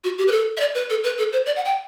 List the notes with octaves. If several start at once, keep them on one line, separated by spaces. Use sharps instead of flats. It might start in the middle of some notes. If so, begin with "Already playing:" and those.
F#4
G4
B4
A4
E5
D5
B4
A4
B4
A4
C5
D5
F#5
G5